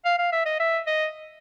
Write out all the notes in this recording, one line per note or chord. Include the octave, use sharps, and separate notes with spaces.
F5
F5
E5
D#5
E5
D#5